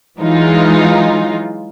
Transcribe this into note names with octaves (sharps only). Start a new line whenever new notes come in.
E3 F#3 G#3 D#4 F4